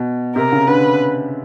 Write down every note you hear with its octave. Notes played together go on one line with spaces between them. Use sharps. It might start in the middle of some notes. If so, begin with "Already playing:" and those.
Already playing: B2
C3 A#4
C#3
D3 B4